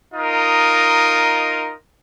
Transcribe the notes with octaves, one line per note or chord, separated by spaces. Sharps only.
D#4 F4 A#4 D#5